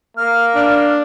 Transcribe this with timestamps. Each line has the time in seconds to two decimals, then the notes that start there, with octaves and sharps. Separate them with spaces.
0.17 A#3 F6
0.55 D4